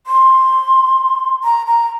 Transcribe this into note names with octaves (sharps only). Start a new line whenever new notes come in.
C6
A#5
A#5